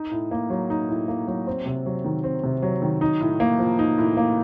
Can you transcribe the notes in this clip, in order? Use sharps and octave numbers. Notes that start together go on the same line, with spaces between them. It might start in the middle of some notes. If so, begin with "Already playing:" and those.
Already playing: D#4
A2
A#3
F#3
D#4
A2
A#3
F#3
C4
C3
F#3
D#3
C4
C3
F#3
D#3
D#4
A2
A#3
F3
D#4
A2
A#3